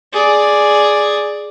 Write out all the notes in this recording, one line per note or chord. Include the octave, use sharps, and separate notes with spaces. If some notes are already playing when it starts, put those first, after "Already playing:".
G#4 D5